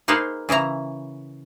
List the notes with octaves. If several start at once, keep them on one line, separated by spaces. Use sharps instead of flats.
A#3 D#4 G#4 B4 C5
C#3 E3 E4 A#5